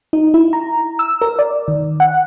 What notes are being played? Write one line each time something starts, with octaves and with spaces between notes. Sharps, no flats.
D#4
E4
A#5
E6
A#4
D5
D#3
F#5